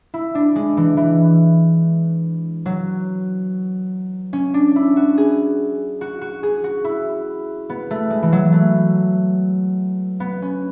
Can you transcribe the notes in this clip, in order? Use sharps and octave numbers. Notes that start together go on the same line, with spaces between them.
E4
D4
G#3
E3
E3
F#3
C#4
D4
E4
F#4
G#4
F#4
F#4
G#4
F#4
E4
B3
A3
G#3
E3
F#3
A3
B3
C#4